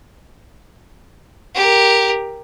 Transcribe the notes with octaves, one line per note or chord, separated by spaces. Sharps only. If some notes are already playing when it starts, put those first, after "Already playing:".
G4 A#4